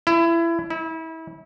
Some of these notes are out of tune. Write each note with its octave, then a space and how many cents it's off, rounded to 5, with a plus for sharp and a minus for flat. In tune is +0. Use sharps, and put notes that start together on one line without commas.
E4 +25
E4 -30